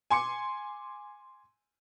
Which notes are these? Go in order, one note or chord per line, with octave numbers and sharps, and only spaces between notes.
G#5 C6 D6 C#7